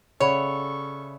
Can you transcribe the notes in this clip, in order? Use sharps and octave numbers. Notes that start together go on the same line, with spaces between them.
C#3 A4 C#5 D5 E5 F#5 B5 C#6